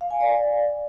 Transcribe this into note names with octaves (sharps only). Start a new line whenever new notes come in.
F5
G#5
D5